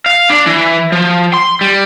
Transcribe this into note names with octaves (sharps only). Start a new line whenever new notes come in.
F5
D4
E3
F3
C6
G3